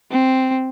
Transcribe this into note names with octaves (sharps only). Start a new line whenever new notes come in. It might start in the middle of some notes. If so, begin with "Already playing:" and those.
C4